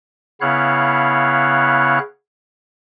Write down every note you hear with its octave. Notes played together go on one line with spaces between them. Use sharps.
C#3 B3 E4 C#5 F5 F#6